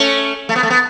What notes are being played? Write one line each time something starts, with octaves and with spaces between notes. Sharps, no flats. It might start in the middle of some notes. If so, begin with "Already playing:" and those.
Already playing: A3 C#4
A3
B3
A3
B3